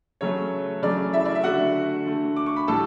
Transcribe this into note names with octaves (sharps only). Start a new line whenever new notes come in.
C#3 F#3 A3 C#5
C#3 F#3 A3 D5
E4 E5
D5
E5
D3 A3 F#4 F#5
D3 A3
D6
C#6
B5
A2 G3 A4 A5